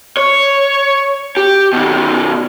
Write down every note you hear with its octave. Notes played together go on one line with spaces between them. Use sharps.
C#5
G4
B2 D#3